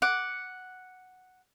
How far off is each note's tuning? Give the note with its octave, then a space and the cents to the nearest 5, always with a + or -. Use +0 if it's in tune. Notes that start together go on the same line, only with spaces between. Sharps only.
F#5 +0 D6 -5